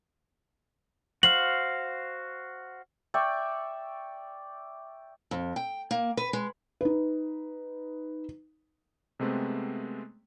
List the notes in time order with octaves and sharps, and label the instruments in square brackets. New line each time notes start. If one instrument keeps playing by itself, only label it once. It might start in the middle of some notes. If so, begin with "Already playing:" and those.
[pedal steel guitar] F#4 C5 F5 [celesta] F#7
[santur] D5 E5 G5 C#6
[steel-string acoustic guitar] F2
G5
A#3
B4
G#3
[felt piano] D#4 B4
[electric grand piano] C3 G#3 A3 B3 C4